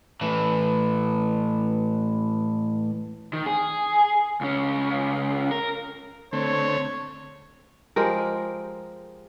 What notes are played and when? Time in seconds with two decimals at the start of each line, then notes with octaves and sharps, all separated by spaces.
0.21 A2 E3
3.33 D#3
3.46 G#4
4.41 C#2 C#4
5.51 A#4
6.33 D3 A3 C4 C#5
7.96 F3 G#3 G4 A#4